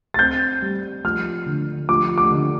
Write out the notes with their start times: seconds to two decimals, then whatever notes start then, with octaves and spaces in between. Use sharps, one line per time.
0.14 A6
0.19 C4 G6
0.62 G3
1.04 F3 F6
1.46 D3
1.89 F3 D6
2.18 D6
2.31 D3